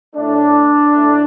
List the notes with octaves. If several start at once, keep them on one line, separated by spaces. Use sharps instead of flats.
A2 A3 D4
A2 A3